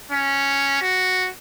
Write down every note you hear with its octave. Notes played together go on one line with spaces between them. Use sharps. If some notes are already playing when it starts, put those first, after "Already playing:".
C#4
F#4